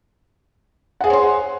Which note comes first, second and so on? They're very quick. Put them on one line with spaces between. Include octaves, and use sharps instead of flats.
F#5 G#4 C5 C#5 C6